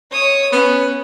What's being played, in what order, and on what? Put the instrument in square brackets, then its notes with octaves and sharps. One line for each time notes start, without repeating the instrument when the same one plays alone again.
[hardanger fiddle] C#5 D#6
[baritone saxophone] B3 [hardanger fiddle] C#4